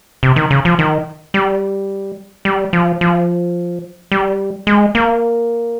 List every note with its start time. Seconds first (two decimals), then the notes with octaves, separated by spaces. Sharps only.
0.23 C3
0.36 D#3
0.50 C#3
0.65 F3
0.79 D#3
1.34 G3
2.45 G3
2.73 F3
3.01 F3
4.12 G3
4.67 G#3
4.95 A#3